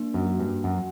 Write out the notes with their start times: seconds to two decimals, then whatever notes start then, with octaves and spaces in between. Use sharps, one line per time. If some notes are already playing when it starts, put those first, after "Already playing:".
Already playing: A#3 D4
0.14 F#2
0.26 F#4
0.40 G2
0.64 F#2 F#5